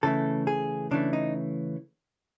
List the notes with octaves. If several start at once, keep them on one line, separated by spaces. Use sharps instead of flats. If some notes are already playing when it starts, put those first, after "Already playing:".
C#3 E3 A3 A4
G#4
C#3 E3 A3 D4
D#4